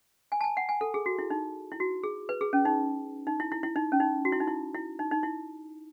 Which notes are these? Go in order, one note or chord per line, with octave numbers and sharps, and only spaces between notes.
G#5
A5
G#5
F#5
G#5
A4
G#4
F#4
E4
D#4
E4
F#4
G#4
B4
G#4
C#4
D#4
D#4
E4
E4
E4
D#4
C#4
D#4
F#4
E4
D#4
E4
E4
D#4
D#4
E4